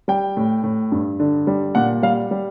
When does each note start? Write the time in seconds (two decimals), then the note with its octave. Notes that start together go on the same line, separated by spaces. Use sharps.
0.08 G3 G5
0.37 A2
0.64 A2
0.92 G2
1.20 D3
1.47 G3
1.75 A#2 F#5
2.03 G3 F5
2.31 G3